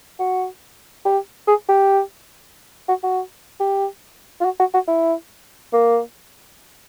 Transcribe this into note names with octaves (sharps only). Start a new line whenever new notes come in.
F#4
G4
G#4
G4
F#4
F#4
G4
F4
F#4
F#4
F#4
E4
A#3